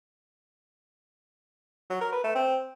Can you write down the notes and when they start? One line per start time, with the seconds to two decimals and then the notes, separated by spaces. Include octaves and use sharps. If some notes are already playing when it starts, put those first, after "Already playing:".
1.90 F#3
2.01 A#4
2.12 B4
2.24 A3
2.35 C4